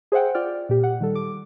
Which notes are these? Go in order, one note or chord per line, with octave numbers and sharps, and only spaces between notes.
G#4 C5 E5 F#5 G5
F4 D5 G5 F6
A#2 G4
F#5
D#3 G3 A4
D6